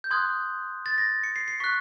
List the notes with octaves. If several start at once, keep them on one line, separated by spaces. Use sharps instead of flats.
G6
C6 D#6 F#6 G#6
A6
A#6
C#7
C7
C7
C#6 F#6 B6